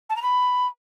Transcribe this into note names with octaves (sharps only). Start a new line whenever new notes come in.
A5
A#5
B5